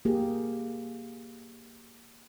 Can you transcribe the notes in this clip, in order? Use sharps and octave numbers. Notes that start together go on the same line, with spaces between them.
A#3 G4 G#4